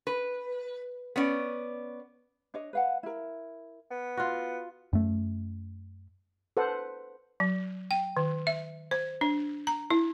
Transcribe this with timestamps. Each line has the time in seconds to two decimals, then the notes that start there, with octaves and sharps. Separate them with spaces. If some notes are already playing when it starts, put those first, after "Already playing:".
0.07 B4
1.16 B3 C#4 D5
2.54 D4 C#5 D#5
2.73 B4 F5 F#5
3.03 E4 A#4
3.91 B3
4.17 F4 F#4
4.93 F#2 A3
6.57 A4 B4 C5 F#5
7.40 F#3
7.91 G5
8.17 D#3
8.47 E5
8.91 C5
9.21 D4
9.67 A#5
9.90 E4